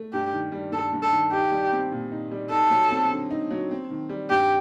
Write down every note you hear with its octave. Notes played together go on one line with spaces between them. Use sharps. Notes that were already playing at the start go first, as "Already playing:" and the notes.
Already playing: A3
G2 G4
D#3
G3
G2 A4
G2
A4
D#3
D#4 G4
G3
C4
A#2
D#4
G3
D#4 A4
F#3
C4
D3
D#4
F#3
C4
D#3
G3
G2 G4